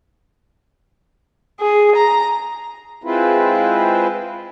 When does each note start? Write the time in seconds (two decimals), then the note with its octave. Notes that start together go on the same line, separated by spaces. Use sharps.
1.60 G#4
1.96 A#5
3.04 G#3 C4 E4 F4 B4